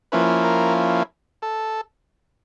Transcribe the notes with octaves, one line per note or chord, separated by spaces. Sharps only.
F3 A#3 C#4 E4 B4
A#4
A4